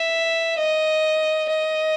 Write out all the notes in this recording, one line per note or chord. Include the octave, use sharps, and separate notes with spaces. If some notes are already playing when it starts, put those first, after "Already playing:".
Already playing: E5
D#5
D#5